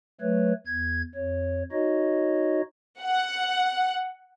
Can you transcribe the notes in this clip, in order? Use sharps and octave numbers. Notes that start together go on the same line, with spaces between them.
F#3 A3 B4 C#5
E2 G#6
F2 C#5
D#4 F#4 C#5 D#5
F#5